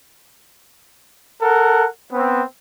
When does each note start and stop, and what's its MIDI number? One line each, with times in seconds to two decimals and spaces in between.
1.42 1.88 69
1.42 1.88 70
1.42 1.88 78
2.13 2.43 59
2.13 2.43 60